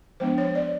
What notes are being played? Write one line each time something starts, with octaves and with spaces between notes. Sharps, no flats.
F3 G#3 B3 D4 C5
C#5
D5